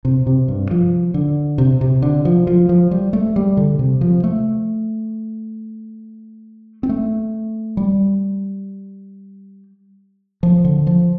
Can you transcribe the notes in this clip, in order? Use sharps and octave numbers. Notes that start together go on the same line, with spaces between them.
C3
C3
G2
F3
D3
C3
C3
D3
F3
F3
F3
G3
A3
G3
D3
C3
F3
A3
C4
A3
G3
F3
D3
F3